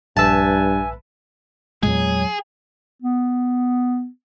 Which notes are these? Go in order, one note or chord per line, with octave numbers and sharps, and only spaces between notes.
A#1 G2 B4 E5 G#5 A5 E6
E2 A#2 F#3 G#3 G#4
B3